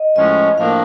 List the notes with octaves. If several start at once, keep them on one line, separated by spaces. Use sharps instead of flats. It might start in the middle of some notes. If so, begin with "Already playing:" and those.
Already playing: D#5
A2 F3 G#3 C#4 D#5
A2 F3 A#3 D4 F5